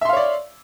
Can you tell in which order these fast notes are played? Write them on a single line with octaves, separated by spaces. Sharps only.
E5 C6 F5 C#5 D5